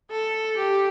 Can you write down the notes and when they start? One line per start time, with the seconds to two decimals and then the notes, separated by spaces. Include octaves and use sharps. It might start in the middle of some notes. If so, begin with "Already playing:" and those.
0.11 A4
0.57 G4